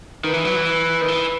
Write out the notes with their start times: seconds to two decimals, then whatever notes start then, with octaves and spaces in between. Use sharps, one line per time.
0.24 D#3 B4
0.34 E3
0.45 F#3
0.56 E3
0.67 B4
1.02 D#3
1.08 E3